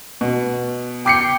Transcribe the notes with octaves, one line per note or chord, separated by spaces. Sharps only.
B2
G5 D6 C7 C#7